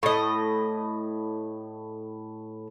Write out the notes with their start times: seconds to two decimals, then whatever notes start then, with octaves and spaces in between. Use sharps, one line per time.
0.03 A2 D#5